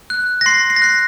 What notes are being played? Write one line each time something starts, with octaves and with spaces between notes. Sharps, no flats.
F#6
A#6
C6 C7
C7
A#6
F#6 C7